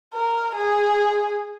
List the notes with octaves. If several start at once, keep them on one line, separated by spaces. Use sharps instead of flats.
A#4
G#4